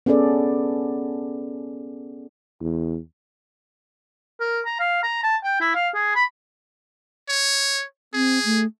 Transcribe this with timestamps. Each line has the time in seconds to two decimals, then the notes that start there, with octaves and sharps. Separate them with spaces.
0.06 B3 C#4 G#4 A4 D5
2.61 E2
4.40 A#4
4.65 A#5
4.80 F5
5.03 A#5
5.23 A5
5.44 G5
5.60 E4
5.75 F5
5.94 G#4
6.15 B5
7.29 C#5
8.14 C4 G#4
8.45 A3